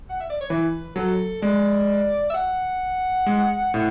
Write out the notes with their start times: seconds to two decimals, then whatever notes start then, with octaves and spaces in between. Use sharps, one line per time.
0.10 F#5
0.20 E5
0.30 D5
0.41 C#5
0.50 E3 B4
0.96 F#3 A4
1.42 G#3 D5
2.30 E5
2.34 F#5
3.26 G#3
3.74 A2